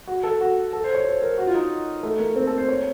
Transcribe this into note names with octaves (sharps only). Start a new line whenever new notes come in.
F#4
A4
F#4
A4
C5
C#5
C5
A#4
F#4
F4
D#4
A3
A#3
C4
A4
C5
C#5